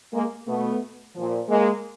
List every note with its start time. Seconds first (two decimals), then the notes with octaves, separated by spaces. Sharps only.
0.13 G#3 A#3
0.47 B2 A3 B3
1.15 A#2 F3
1.49 G#3 A#3